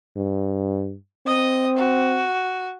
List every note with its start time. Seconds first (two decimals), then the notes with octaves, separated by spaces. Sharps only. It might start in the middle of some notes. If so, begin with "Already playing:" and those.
0.16 G2
1.26 C4 D#5 D#6
1.77 F#4